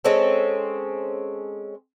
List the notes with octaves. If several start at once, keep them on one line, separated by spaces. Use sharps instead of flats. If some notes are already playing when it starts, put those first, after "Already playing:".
G#3 C4 C#4 A4